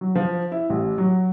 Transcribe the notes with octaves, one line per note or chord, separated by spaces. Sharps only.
F#3
F3
E4
A1
F#3